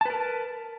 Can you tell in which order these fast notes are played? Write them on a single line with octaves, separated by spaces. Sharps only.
A5 B4 A#4